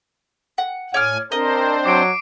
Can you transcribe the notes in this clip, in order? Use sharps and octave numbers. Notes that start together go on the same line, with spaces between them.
F#5
A2 C#5 D5 G#5 F6
C4 D4 A#4 C5 D#5
F#3 D6 C7 D7